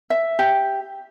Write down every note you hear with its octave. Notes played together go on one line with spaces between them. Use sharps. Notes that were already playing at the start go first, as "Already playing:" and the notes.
E5
G4